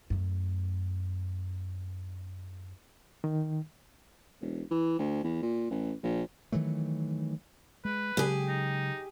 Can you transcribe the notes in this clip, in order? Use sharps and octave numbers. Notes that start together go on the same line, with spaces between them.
F#2 A3
D#3
E1
E3
D2
E2
A#2
A1
A#1
D#3 E3 F#3 A3
G#3 B4
C#3 F#3 G#3 G4 G#4
D#4